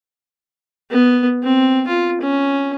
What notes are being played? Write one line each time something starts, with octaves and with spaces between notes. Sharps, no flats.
B3
C4
F4
C#4